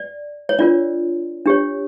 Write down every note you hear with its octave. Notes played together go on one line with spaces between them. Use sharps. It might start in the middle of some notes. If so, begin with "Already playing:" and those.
Already playing: D5
C#5
D4 F4 A#4 D5
D4 G4 C#5